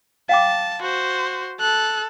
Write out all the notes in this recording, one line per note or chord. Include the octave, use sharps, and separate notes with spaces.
F5 G5 A5 D6
F#4 C5
A4 F#6